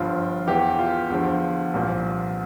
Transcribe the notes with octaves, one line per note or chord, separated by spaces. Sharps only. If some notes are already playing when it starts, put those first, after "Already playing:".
Already playing: G1 G2 F3 F4
E2 E3 G4
F4
E2 D3 F3
C2 A#2 F3